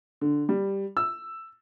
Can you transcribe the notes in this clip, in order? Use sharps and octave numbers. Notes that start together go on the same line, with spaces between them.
D3
G3
E6